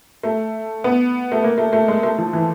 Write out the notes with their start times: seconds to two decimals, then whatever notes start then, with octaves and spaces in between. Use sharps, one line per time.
0.23 A3
0.84 B3
1.32 A3
1.44 A#3
1.58 A3
1.73 A3
1.88 G#3
2.03 A3
2.18 F3
2.33 E3